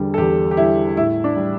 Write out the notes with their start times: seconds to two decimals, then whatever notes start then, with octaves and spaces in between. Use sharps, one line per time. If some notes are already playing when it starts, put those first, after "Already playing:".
Already playing: E2 D3 G3
0.14 A4
0.18 E2 G4
0.51 G4
0.57 D3 G3 E4
0.97 A2 E4
1.24 D4
1.36 G3